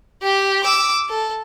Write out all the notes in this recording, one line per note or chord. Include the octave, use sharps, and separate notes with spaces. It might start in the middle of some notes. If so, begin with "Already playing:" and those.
G4 G5
D6 E6
A4